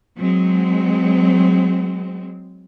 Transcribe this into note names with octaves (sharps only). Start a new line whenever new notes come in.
F#3 G#3 C4